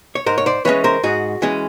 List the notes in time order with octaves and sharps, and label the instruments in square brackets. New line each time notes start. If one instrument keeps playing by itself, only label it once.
[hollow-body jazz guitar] C#5
G#2 A#4 C5
C#5
C5 D5
E3 G#3 C#4 B4 C#5
A#4 C5
G#2 F#4 G#4
E3 G#3 C#4